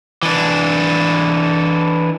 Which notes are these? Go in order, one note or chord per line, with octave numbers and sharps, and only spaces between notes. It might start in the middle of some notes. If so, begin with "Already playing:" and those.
E3 D4